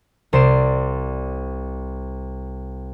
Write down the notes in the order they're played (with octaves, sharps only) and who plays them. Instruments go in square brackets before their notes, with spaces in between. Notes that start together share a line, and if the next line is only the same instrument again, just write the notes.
[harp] C2 C5 D5 C6 C7 E7